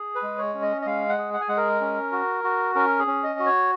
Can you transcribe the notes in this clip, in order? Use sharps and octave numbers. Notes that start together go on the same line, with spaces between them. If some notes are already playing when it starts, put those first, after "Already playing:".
Already playing: G#4
B4
G#3
C#5
C#4
D#5
D#5
G#3 F5
F#5
G#4
F#5
G#5
G#3 F#5
A#4
C#4
F#4
F#4
C#4 A#4
G#4
C#4
D#5
F#4
C#5